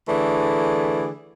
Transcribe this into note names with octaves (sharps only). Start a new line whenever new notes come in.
D3 E3 A3 G#4 D5